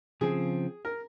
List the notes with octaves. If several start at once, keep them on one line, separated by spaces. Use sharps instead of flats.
C#3 F3 C4 G#4
A#4